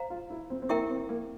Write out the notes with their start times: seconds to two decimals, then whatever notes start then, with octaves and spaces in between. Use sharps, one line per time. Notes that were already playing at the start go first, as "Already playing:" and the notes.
Already playing: C5 F5 A#5
0.10 F4
0.30 E4
0.50 C4
0.62 C4
0.69 A#3 E4 G4 A#4 E5 G5
0.90 C4
1.09 A#3